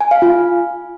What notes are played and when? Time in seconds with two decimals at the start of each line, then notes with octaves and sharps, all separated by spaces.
0.01 G#5
0.11 F5
0.22 F4